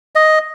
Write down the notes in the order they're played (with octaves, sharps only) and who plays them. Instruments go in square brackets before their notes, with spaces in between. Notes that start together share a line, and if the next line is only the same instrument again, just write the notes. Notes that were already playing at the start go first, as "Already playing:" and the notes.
[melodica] D#5